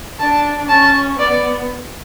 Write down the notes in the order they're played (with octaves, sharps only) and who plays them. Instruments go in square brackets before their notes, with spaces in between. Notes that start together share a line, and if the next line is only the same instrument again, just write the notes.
[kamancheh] D4 [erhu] A5
[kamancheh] C#4 [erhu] A5
[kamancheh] B3 [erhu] D5